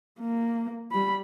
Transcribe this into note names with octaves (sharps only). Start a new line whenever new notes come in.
A#3
G3 B5